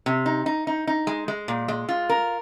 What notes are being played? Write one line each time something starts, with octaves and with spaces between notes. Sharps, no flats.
C3
D#4
D#4
D#4
D#4
G#3
G#3
A#2
G#3
F4
A#4